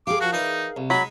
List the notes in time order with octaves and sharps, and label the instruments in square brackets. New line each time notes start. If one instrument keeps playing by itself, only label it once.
[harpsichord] G4 [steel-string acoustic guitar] G#4 A#4 F5 [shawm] D6
[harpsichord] F3 [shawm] F#4
[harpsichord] E3 D5 D#6 [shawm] D#4
[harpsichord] C2
[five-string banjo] F#3 [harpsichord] G#3 D#4 [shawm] B5